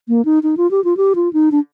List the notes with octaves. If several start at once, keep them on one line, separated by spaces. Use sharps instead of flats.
A#3
D#4
D#4
F4
G4
F4
G4
F4
D#4
D4